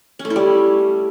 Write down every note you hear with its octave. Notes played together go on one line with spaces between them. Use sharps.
C#4
A3
E4
G3